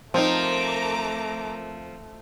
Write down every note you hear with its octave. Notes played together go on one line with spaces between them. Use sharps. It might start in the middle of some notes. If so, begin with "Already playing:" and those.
F3 A3 C4 D#4 A#4 A#5 D6